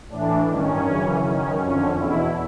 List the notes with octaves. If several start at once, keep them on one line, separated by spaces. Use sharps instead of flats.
A2 E3 D4
G2 D#3 C#4
F#2 C#3 E3
F#2 D#3 C#4
F2 D3 C#4
E2 B2 E4